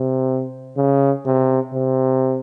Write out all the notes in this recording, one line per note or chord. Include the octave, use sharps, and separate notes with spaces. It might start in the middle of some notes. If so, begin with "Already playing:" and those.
Already playing: C3
C#3
C3
C3